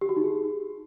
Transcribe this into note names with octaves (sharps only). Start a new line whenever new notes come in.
G4
F#4
D#4
G#4